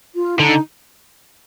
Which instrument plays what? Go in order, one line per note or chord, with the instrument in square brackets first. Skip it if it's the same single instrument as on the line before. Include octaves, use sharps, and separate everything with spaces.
[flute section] F4
[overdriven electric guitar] D3 [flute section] D#4